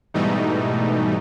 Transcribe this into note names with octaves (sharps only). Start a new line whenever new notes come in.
G#2 B2 E3 G3 A3 D#4